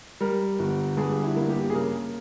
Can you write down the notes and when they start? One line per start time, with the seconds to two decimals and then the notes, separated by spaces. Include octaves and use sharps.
0.21 G3 A#4
0.59 G1
0.97 G2 G#4
1.24 E4
1.36 A#3
1.49 G4
1.70 G#4
1.75 C#3 A#4